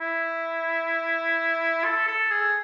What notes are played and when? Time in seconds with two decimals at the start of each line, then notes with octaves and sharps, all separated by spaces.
0.01 E4
1.85 A4
2.08 A4
2.31 G#4